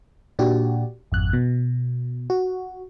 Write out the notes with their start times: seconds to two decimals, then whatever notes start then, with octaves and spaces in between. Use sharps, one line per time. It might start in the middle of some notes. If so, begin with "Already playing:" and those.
0.39 A#2 D4 F#4 G4
1.12 G#1 F2 F#6
1.33 B2
2.30 F#4